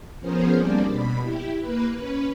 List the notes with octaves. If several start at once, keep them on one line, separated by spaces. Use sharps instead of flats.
F3 B3 C#4 G#4 A#4 C5
G3 A#3 C4 D4 D5
B2 B5
E4 G4
A#3 B4
C#4 B4